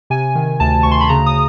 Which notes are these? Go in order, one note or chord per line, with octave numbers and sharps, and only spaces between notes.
C3 G#5
D#3
D2 A5
D2 C#6
C6
B5
C#3 A#5
D#6